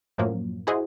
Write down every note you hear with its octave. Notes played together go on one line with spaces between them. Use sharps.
F#2 A2 F3 F#3 A#3
E4 F#4 G#4 C5 D#5